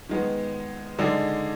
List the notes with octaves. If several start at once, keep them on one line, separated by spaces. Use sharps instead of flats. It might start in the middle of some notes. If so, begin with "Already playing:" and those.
D#3 G#3 B3
D3 G#3 D#4 G#4 D5